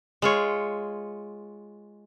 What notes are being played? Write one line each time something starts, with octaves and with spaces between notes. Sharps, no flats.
G#3 F4 C#5